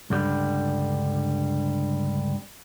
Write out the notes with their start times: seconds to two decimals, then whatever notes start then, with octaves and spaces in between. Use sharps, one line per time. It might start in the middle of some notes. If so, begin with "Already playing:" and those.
0.10 C#2 G2 D3 G3 G4